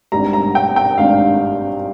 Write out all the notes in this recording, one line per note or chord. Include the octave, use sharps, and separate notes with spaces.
G#1 G2 G3 A#5
A#5
G5
G5
G#1 G2 G3 F5